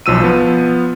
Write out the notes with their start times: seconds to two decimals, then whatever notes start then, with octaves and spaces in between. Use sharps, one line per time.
0.06 B1 F3 E6 D#7
0.20 F3 B3